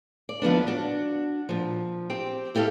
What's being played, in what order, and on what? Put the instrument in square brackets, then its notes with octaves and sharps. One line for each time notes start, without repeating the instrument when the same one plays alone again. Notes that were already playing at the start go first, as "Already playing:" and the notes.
[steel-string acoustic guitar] D5
D#2 F3 B3 D4
D4 F#4
A#2 F3
C4 G4 G5
E4 G4 A4 D5 F5